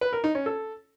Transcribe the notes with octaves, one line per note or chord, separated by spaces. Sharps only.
B4
A#4
D#4
C#4
A4